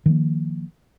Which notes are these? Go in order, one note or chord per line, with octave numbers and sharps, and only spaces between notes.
D#3 F3 A#3